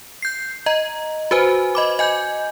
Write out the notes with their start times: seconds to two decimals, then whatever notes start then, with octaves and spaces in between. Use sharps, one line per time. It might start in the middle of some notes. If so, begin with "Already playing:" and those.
0.22 G6 C7
0.66 D#5 A#5
1.31 F#4 B4 C5 G#5
1.75 D#5 B5 D6
1.99 D#5 G#5 G6